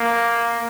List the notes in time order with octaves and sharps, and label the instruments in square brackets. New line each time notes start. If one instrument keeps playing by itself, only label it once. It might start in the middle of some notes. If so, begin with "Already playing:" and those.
Already playing: [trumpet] A#3